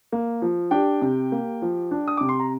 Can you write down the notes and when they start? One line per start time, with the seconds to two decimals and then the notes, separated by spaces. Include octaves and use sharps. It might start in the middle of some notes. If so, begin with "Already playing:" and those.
0.12 A#3
0.42 F3
0.71 D4 G4 G5
1.01 C3
1.32 A#3
1.62 F3
1.91 D4
2.08 D#6
2.17 C3 D6
2.29 C6
2.40 A#5